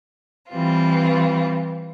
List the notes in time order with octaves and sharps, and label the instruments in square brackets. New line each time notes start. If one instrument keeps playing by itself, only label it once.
[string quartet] E3 G3 C4 F4